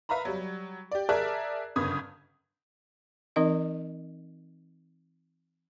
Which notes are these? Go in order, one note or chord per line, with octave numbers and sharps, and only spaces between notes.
B4 E5 F5 A#5 B5
F#3 G3
G4 D5
G#4 A#4 D5 E5 A5 F#6
G1 F#2 C#3 B4 D#6 G#6
E3 C4 D#4 A#4 D#5